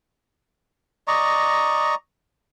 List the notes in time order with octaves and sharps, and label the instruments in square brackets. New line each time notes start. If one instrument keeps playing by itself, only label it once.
[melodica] D5 D#5 A#5 C#6